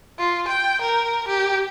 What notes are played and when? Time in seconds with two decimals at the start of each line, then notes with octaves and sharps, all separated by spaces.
0.18 F4
0.48 G5
0.82 A#4
1.28 G4